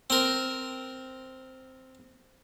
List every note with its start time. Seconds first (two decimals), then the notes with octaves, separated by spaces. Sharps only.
0.10 C4 A#4